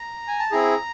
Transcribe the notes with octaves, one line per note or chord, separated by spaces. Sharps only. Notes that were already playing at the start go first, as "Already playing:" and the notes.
Already playing: A#5
G#5
A5
C4 E4 G#4 A#5